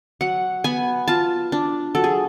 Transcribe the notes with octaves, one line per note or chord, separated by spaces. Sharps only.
F#3 F#5
B3 G#5
F4 A5
D4
F#3 A4
G#4